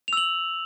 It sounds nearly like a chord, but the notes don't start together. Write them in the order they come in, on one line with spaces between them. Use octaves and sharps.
F7 E6 F#7